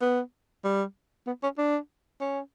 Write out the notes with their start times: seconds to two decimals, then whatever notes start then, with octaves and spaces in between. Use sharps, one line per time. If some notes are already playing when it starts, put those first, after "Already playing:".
0.01 B3
0.64 G3
1.27 B3
1.43 C#4
1.58 D4
2.21 C#4